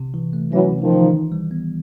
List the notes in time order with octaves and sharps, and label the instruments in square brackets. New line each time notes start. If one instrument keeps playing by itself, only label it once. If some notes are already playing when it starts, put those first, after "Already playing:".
Already playing: [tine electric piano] C3
E3
A3
[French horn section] E3 F#3 [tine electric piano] C#4
[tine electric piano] C3
[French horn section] D#3 F3
[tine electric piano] E3
D#3
G3
B3